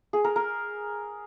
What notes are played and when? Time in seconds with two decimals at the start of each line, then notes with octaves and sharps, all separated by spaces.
0.13 G#4
0.24 A#4
0.36 A#4